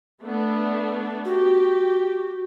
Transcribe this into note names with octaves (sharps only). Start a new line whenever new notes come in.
A3 B3 D4
F#4 G4